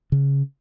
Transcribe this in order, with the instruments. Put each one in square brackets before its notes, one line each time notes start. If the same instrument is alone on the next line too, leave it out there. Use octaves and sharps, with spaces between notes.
[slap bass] C#3